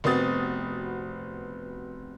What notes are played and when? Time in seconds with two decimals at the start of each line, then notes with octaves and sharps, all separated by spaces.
0.04 F1 B3 C4 F#4 D#6 A6